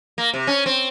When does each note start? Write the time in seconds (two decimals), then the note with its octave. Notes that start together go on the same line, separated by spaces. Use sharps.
0.18 A#3
0.33 C3
0.47 C#4
0.66 C4